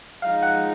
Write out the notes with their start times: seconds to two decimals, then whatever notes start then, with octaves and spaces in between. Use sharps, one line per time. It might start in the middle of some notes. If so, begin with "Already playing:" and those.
0.22 F3 G#3 D#4 F5
0.43 F#5